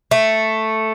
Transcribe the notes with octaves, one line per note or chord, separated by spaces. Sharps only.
A3